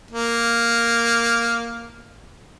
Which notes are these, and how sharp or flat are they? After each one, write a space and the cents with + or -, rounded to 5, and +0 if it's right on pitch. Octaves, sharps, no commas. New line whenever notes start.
A#3 +0